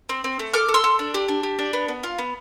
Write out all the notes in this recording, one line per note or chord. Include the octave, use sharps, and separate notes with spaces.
C4
C4
A3
A4 D6 F6
A4
C6 E6
A4
D4
G4
D4
G4
D4
B3
B3
F4
B3